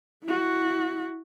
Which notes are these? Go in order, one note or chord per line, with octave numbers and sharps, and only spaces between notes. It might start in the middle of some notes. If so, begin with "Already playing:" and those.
E4 F#4